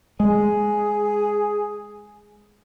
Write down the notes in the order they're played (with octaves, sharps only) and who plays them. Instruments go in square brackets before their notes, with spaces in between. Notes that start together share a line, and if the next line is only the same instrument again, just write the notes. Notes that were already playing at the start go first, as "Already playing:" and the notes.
[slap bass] G#3 [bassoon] G#4